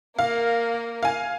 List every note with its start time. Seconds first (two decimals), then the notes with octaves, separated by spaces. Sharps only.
0.19 A#3 A#4 F5
1.03 F5 G#5